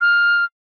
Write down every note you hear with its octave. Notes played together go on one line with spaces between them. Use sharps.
F6